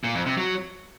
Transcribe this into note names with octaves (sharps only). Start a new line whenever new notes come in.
A#2
F2
C3
F#3